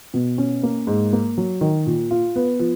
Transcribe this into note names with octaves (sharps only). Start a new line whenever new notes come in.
B2
C#4
A#3
G#2
A#3
F#3
D#3
A#2
F4
B3
F3